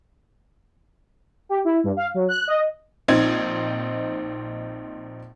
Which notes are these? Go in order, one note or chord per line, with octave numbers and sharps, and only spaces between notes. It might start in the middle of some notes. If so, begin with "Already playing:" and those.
G4
E4
G2
F5
F#3
F#6
D#5
A#1 C4 D#4 G#6